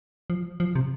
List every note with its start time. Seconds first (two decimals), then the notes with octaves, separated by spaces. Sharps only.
0.30 F3
0.60 F3
0.75 C3